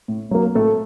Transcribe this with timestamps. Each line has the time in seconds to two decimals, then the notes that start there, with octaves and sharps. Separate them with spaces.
0.08 A2
0.31 F#3 A#3
0.55 A2 A3 A4